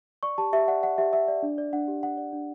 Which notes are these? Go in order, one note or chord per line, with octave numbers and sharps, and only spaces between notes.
D5 C#6
G4 A5
G4 E5
D5 F#5
D5 F#5
G4 E5
G4 E5
D5
D4
D5
D4 F#5
G4
D4 F#5
D5
D4